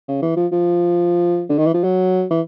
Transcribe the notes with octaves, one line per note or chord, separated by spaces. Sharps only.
C#3
E3
F3
F3
D3
D#3
E3
F3
F#3
E3